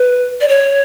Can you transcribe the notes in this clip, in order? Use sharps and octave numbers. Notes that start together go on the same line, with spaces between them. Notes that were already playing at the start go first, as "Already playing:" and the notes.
Already playing: B4
D5
C#5